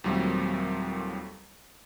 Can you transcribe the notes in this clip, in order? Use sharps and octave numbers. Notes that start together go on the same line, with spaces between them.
D#2 A#2 F#3 G3 A3 C4